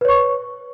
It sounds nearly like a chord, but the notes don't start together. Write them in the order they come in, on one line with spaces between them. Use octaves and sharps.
B4 C#5 C#6